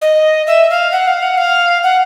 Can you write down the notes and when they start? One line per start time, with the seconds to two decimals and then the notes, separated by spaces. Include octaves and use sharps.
0.02 D#5
0.47 E5
0.70 F5
0.92 F#5
1.08 F5
1.23 F#5
1.38 F5
1.83 F#5